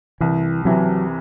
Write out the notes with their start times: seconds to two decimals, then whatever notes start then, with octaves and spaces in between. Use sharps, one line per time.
0.21 C2 E3
0.65 C3 E3 F#3